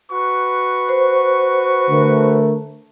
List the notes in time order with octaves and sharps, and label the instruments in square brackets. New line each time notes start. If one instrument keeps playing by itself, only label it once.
[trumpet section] F#4 B4 C#6
[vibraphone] C5
[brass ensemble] D3 A3 A#4